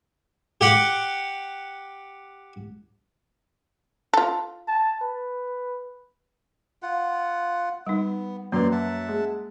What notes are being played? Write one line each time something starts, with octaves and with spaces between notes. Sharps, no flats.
G4 F#5 D6
F4 A4
A5
B4
F4 F#5
G3 B3 D#4
F#2 F#3 A#3 B4 D5 C6
E5 F#5 A5
G#3